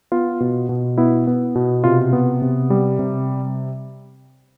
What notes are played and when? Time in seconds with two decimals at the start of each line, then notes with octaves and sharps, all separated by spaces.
0.12 B3 F4
0.40 B2
0.69 B2
0.98 B3 E4
1.27 B3
1.55 B2
1.84 C3 F4
2.13 B3
2.42 C3
2.70 G3
2.99 C3